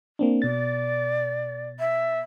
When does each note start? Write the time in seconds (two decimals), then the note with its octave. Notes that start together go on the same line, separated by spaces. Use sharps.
0.19 A#3 C4 D4
0.42 B2 D5 A6
1.79 E5